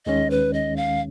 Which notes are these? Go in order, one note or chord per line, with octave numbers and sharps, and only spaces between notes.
D#2 D#3 G#3 C#4 D#5
B4
D#5
F5